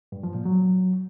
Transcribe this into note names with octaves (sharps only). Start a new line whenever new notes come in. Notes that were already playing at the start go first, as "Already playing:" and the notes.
G2
F3
A#2
F#3